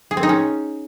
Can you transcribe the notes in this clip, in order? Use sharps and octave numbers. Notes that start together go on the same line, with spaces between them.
G#4
C4
D#4
C#4